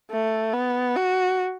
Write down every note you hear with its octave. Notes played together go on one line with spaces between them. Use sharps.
A3
B3
F#4